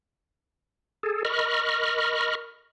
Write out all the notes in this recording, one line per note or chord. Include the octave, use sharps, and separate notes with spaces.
G#4 A4
A#4 D#5 B5 C#6 F6